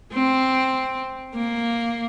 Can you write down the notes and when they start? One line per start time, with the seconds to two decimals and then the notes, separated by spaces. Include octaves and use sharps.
0.13 C4
1.35 A#3